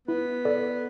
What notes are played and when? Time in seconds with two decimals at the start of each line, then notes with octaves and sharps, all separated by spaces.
0.07 B3 E4
0.45 A4 D5